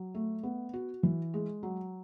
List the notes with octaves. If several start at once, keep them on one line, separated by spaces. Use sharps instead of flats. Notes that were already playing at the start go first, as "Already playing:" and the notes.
Already playing: F#3
A3
B3
F#4
E3
G#3
F#3